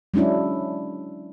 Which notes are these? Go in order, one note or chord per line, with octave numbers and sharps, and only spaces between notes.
F#3 G#3 C#4 D4 E4